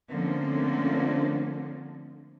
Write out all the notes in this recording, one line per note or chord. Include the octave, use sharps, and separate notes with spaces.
D3 F3 A3 A#3 C4 C#4